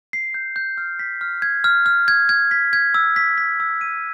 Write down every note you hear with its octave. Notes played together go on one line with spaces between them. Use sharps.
C7
G6
G6
F6
B6
F6
G#6
F6
F6
G#6
G#6
B6
G#6
E6
B6
B6
E6
D#7